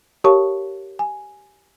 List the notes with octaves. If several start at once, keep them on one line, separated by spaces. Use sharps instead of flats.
G4 A#4 C#5 F5 A5 C#6
G#5